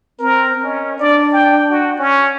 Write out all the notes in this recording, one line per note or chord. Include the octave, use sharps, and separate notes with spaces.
C4 A#4
C#4 D#5
D4 D5
G5
F#4
C#4 C#6